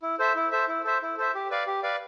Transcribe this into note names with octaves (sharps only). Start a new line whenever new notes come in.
E4
A4 C5 E5
E4
A4 C5 E5
E4
A4 C5 E5
E4
A4 C5 E5
G4
B4 D5 F5
G4
B4 D5 F5